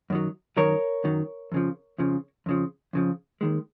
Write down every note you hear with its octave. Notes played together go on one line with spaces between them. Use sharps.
F#2 D#3 F#3
F#2 D#3 F#3 A#4 C#5
F#2 D#3 F#3
F2 C#3 F3
F2 C#3 F3
F2 C#3 F3
F2 C#3 F3
D#2 D#3 G#3